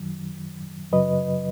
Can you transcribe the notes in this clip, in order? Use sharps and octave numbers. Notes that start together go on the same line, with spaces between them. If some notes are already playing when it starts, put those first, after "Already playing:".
Already playing: F#2 D#3 F#3
F#2 C#3 F#3 B4 D#5